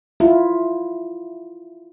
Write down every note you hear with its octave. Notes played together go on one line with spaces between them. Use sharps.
E4 F4